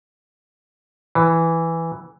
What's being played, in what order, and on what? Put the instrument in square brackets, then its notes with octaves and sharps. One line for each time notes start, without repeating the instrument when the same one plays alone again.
[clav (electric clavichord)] E3